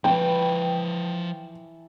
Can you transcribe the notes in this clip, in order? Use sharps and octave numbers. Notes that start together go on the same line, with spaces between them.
E3 F3 C#5 G5 A5 B5